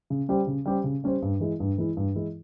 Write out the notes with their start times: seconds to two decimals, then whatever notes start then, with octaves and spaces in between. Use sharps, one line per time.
0.10 C#3
0.29 G3 C#4 G4 C5
0.47 C#3
0.66 G3 C#4 G4 C5
0.84 C#3
1.04 G3 C#4 G4 C5
1.22 G2
1.40 E3 G#3 E4
1.60 G2
1.78 E3 G#3 E4
1.97 G2
2.15 E3 G#3 E4